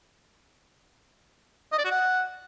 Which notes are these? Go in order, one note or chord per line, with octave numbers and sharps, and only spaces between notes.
D#5
D5
F#4
F#5